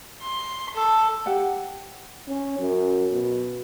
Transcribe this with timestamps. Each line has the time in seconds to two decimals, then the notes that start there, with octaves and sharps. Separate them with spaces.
0.22 C6
0.75 A4
1.26 G4 F#5 G5
2.28 C#4
2.59 F#2
3.12 B2